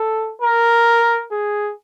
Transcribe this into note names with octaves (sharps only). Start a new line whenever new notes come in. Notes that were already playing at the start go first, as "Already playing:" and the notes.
Already playing: A4
A#4
G#4